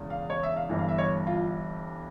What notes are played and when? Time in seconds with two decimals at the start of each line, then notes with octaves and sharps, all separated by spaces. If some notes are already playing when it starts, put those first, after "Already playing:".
Already playing: E1 E2 C#3
0.10 F5
0.30 C#5
0.43 E5
0.56 F5
0.69 G1 G2 E3
0.79 F5
0.89 E5
0.98 C#5
1.27 F4